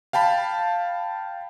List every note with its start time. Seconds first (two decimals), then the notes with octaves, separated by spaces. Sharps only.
0.13 F5 G5 A5 B5